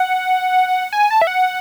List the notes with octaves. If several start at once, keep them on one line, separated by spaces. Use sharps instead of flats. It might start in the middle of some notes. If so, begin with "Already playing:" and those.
Already playing: F#5
G#5
A5
E5
F#5